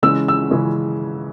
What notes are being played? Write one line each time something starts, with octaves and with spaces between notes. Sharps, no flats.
C#3 E3 G#3 C#4 E6
E6
C#3 E3 G#3 C#4